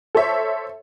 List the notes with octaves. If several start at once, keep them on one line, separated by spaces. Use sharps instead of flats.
A4 C5 C#5 E5